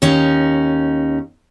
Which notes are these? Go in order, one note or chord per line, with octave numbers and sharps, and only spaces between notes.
D#2 C#4 D#4